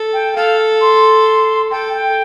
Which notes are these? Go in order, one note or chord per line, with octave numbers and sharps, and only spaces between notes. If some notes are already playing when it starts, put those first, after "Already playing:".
Already playing: A4
G5
A4 F5
C6
A4 G5
G5